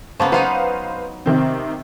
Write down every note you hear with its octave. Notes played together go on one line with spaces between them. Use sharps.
C#3 A#3 B3 C5 A5 C#6
F#3 B3 D#4 B4 C5 F5
C3 D#3 C4